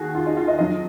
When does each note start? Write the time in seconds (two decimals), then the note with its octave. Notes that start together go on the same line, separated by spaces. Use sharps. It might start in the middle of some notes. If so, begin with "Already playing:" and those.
Already playing: D#2 F#4 G#4
0.15 F4
0.26 D#4
0.37 F4
0.48 D#5
0.58 F2 D3 F#3 D#5